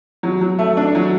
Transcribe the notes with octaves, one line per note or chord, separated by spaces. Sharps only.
F#3
F#3
A3
D4
F#3